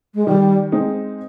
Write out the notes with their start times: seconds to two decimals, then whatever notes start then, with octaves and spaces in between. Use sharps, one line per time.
0.15 G#3
0.26 D#3 G3
0.72 G#3 C4 D#4